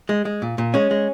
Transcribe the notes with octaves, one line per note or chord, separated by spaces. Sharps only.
G#3
G#3
A#2
A#2
G#3 C#4
G#3